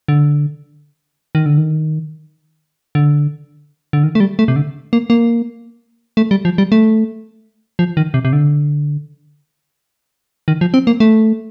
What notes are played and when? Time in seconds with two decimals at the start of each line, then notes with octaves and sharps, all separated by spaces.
0.08 D3
1.35 D#3
1.46 D3
1.58 D#3
2.95 D3
3.93 D3
4.03 D#3
4.15 A3
4.20 G3
4.39 A3
4.48 C3
4.56 D3
4.93 A#3
5.10 A#3
6.17 A3
6.31 G3
6.45 F3
6.58 G3
6.72 A3
7.79 F3
7.97 D#3
8.14 C3
8.25 C3
8.33 D3
10.48 D#3
10.61 F3
10.74 C4
10.87 A#3
11.00 A3